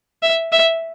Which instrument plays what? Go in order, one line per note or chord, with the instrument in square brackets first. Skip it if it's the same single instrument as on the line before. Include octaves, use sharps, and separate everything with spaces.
[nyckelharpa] E5
E5